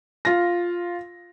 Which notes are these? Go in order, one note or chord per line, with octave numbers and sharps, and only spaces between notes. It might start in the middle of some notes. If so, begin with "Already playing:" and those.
F4 A#6